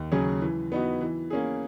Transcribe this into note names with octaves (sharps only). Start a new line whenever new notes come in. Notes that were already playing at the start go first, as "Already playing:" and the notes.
Already playing: D#2
C#3 F#3 C#4 G#4
E3
B3 D#4 F#4
E3
A#3 C#4 G#4